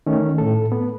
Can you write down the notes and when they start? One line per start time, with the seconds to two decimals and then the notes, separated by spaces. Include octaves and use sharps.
0.06 D#3 A3 C#4
0.38 A2 A4
0.72 B3